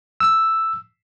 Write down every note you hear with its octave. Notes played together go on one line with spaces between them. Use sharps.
E6